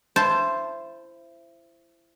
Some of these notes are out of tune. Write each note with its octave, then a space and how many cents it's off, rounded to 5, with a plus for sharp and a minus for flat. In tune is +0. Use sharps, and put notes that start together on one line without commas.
E4 +30 C5 +0 A5 -5